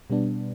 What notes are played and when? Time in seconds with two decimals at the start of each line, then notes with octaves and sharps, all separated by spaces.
0.10 B2 G3 B3 D4